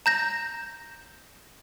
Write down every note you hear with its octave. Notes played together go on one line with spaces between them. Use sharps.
A#5 G6 A#6